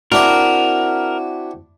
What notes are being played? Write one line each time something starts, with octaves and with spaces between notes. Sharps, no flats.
C4 D4 E4 F#4 A#4 D5